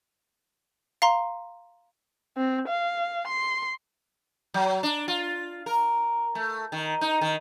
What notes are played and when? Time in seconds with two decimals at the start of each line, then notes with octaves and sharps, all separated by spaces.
1.02 F5 A#5 C6
2.37 C4
2.68 F5
3.27 C6
4.54 F#3
4.83 D4
5.08 F4
5.66 A#4
6.35 A3
6.72 D#3
7.01 D#4
7.21 D#3